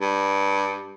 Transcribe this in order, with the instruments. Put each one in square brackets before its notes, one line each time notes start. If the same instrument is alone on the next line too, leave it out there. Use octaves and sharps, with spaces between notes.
[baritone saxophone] G2